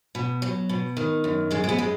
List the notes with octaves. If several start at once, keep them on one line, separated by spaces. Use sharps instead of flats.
B2
F#3
B2
D#3
F#2
F#2 G#3
G#3
B3
G#3